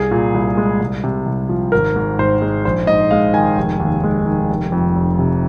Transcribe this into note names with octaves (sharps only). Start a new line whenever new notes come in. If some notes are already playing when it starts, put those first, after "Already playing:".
Already playing: C2 G#4
A#2
C2
G#3
C2
C3
C2
F3
G#1 A#4
G#2
G#1 C5
G#3
A#1 C5
G#2 D#5
G#3 F5
D#3 G#5
F1
D#2
G#3
D#3
F1
F2
F1
C3